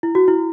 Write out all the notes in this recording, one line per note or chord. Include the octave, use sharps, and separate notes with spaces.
E4
F#4
E4